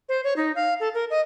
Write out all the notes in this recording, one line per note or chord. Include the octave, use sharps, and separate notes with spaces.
C5
C#5
D#4
F5
A4
A#4
D#5